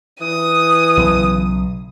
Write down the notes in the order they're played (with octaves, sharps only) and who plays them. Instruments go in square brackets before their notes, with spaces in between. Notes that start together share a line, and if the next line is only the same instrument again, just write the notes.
[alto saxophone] E3 [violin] D#6
[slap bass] B1 C#3